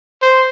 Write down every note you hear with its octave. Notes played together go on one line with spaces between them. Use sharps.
C5